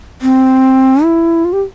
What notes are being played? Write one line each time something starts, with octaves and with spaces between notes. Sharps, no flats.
C4
E4
F4
G4